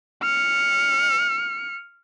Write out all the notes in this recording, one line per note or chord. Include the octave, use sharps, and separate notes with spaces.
F6 C#7